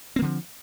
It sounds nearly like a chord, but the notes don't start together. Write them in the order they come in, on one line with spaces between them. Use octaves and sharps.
C4 A#3 D3 F3